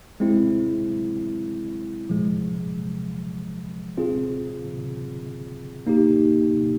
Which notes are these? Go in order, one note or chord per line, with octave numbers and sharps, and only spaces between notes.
G#3 C4 E4
A#2 F3 G#3
C4 F4 G#4
A#3 D#4 G4